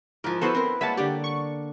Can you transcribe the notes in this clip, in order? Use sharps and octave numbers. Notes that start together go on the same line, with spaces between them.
G#2 F3 E4 A#4
F3 B3 E4 F#4 A4 B4 C5
C4 A#4
G3 G#3 A#3 C#5 E5 F#5 A5
D3 D4 G4 D5
C#6